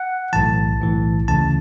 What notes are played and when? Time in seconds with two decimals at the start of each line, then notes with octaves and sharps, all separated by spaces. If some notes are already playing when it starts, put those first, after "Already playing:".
Already playing: F#5
0.33 B1 A2 E3 A5
0.80 B1 A2 E3
1.28 D2 C#3 E3 A5